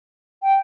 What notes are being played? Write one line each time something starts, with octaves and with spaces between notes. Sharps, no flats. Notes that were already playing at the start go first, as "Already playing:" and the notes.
G5